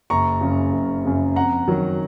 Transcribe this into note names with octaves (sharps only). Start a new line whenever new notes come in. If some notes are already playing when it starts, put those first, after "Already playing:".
F#1 A#5 C#6
F#2 C#3
F#1
F#2 C#3
F2 F#5 A#5
D#3 F#3